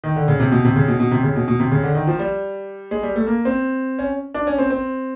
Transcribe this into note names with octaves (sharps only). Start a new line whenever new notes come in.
D#3
D3
C#3
C3
B2
C3
C#3
B2
B2
C3
C#3
B2
B2
C3
C#3
D3
D#3
F3
G3
G#3
G3
A3
A#3
C4
C#4
D4
C#4
C4
C4